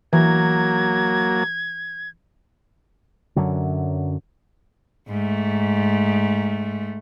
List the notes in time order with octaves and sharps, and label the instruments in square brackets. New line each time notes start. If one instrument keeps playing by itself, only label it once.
[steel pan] E3 [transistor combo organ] F#3 A#3 [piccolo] G#6
[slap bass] F#2 D3 F#3
[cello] G#2 A3